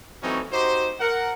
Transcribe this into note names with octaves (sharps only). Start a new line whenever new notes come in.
E3 F#3 A3 C4 C#4 D#4
D#4 F#4 G4 C5
A#4 F#5